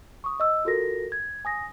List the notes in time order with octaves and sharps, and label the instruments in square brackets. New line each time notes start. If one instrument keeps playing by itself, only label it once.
[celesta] C#6 D#6
D#5 E6
F4 F#4 A4 A#4 A#6
G#6
G#5 D#6 A#6